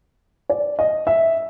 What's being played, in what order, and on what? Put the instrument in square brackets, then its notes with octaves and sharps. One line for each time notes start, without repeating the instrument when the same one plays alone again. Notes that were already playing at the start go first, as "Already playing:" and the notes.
[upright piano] D5
D#5
E5